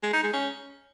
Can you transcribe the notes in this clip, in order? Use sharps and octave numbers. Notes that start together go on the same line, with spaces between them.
G#3
D#4
G#3
C#4